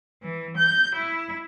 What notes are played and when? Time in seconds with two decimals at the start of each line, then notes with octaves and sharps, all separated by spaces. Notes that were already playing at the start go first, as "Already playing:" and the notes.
0.23 E3
0.58 G6
0.96 E4